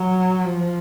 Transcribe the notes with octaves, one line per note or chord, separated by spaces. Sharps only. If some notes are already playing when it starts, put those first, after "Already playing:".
Already playing: F#3
F3